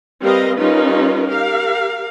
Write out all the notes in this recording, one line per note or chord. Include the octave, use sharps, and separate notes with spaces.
G3 C4 A#4 B4 D#5 F5
G3 C#4 D#4 F4 A#4 B4
G4 A#4 F5